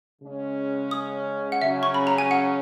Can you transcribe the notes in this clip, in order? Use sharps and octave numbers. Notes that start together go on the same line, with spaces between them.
C#3 G#3 C#4
D#6
F#5
C#3 F#3 C#4 E5
C#6
B5
A#5
G#5
F#5